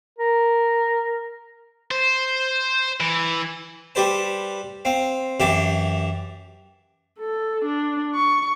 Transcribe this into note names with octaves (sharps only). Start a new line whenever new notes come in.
A#4
C5
E3
G3 G4 B4 C5 A5
C4 F5
F#2 E3 G4 F5 A5
A4
D4
C#6